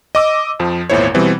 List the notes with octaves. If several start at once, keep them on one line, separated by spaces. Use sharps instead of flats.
D#5 D6 E6
F2 F3
G#1 E2 A#2 E4 C5 C#5
B2 E3 G3 C4